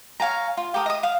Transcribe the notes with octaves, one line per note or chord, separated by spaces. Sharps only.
C#5 F5 G#5 A#5
F4
G4 A4 A#4 D#6
D#5 D#6
F5